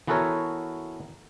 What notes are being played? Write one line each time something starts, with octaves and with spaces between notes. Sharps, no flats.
E3 B3 F#4 A4 A#4 C#5